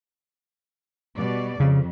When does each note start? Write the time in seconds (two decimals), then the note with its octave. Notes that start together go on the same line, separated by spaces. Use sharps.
1.17 B2 G3 D5
1.60 F2 C#3